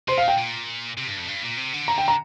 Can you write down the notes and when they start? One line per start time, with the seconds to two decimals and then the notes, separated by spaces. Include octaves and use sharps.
0.08 C3 C5
0.18 F5
0.23 A#2 G5
0.38 A#2
0.97 C3
1.07 G2
1.17 F2
1.28 G2
1.43 A#2
1.57 C3
1.73 D3
1.88 A#5
1.98 G5
2.08 A#5